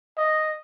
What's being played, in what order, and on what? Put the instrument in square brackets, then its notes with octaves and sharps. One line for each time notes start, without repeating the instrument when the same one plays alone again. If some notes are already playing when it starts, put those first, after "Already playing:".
[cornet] D#5